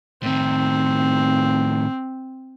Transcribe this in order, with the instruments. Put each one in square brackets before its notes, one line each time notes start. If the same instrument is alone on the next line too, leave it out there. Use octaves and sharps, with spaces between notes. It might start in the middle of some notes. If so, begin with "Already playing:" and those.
[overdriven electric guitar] A2 D#3 [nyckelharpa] C4